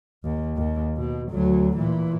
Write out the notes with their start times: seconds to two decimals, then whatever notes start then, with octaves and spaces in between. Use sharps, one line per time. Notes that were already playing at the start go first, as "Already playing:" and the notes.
0.24 D#2
0.57 D#2
0.97 B2
1.31 D2 F#3
1.77 A#2 E3